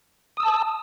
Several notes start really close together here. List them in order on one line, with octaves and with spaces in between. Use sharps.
D#6 E6 A5